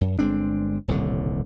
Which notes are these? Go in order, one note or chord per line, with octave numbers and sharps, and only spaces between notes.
F#2
G1 G#3 C4 D4
D#1 C2 A2 D3